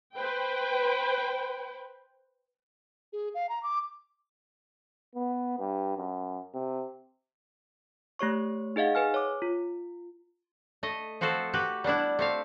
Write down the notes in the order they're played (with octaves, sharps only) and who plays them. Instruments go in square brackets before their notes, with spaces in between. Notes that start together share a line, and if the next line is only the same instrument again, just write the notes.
[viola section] B4 C5 G5
[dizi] G#4
F5
A#5
D6
[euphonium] B3
G2
F#2
C3
[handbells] A3 G4 C#5 C#6
D#4 G#4 D#5 F5 F#5
G#4 B4 G#5 F6
C#5 D6
F4
[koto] A3 D#5
F3 C4 F#4 A4 C5
F#4 G4 B4
G3 B3 D4 E4
A3 C4 F5